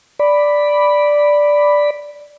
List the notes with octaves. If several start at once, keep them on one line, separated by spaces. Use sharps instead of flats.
D5 B5